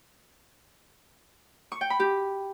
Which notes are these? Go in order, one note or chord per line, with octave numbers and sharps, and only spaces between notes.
C#6
G5
B5
G4